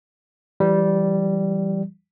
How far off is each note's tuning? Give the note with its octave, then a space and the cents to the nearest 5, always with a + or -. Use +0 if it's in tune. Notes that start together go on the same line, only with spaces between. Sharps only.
E3 +30 G3 -10